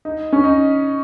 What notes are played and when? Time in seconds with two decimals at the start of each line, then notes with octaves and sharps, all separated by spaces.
0.05 D#4
0.33 C#4
0.44 D#4